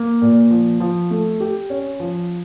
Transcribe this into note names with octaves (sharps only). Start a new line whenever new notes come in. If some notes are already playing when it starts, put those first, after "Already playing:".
Already playing: A#3
A#2
F3
F3
A3
G4
C#4
F3